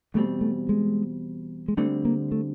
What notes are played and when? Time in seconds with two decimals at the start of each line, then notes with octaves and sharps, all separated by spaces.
0.14 E2 B2 G3 A3 C4
0.41 A3
0.69 G#3
1.68 G#3
1.77 D2 D3 G3 A3 C4
2.05 A#3
2.32 A3